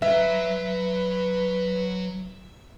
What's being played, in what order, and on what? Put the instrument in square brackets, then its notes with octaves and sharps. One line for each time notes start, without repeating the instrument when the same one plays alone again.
[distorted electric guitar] F#3 A#5 [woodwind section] B4 [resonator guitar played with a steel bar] E5